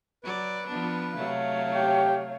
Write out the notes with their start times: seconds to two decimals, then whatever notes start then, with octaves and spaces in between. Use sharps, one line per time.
0.24 F#3 B4 D5
0.67 F3 B3 D4
1.16 C3 F#3 A3 C#5 F5
1.75 G4 G5